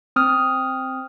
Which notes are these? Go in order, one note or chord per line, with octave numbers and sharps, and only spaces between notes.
C4 D#6 F6